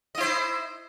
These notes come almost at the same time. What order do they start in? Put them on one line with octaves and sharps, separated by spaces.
D#5 E4 C5